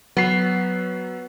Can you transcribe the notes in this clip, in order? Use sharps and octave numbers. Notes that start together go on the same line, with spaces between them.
F#3 B3 C7